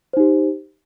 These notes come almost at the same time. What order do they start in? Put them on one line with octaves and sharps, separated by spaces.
C5 D#4 G4